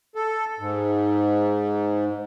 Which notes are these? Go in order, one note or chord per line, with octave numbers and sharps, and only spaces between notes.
A4
G#2